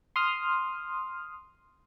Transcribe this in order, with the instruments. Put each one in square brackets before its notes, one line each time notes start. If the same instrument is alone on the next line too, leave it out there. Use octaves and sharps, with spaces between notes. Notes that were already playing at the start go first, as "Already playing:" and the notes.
[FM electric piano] C6 D#6 F6